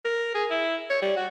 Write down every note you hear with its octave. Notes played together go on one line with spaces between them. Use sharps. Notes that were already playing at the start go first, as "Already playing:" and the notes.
A#4
G#4
E4
C#5
G3
F#4